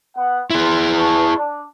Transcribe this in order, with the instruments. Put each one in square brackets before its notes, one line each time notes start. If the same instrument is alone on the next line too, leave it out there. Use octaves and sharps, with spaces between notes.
[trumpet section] B3 F#5
[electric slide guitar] E4 G#4 [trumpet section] C6
[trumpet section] B4 A5 C#6
D4